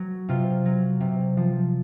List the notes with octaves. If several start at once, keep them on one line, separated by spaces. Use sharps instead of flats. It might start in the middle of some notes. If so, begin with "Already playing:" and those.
Already playing: F#3
C3 F4
F#3
C3
F3